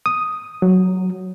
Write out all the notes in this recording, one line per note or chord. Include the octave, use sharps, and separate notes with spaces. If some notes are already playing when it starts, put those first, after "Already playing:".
D#6
F#3